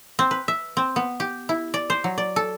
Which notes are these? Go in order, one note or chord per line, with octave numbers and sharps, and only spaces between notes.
C4
B4
E5
C4
B3
G4
E4
D5
C5
F#3
D5
A4